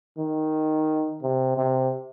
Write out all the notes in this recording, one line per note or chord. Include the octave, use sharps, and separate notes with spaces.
D#3
C3
C3